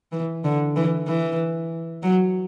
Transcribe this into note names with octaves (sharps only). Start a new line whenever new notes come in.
E3
D3
E3
E3
F#3